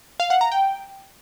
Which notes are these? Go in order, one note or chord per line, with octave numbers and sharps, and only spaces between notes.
F5
F#5
A#5
G5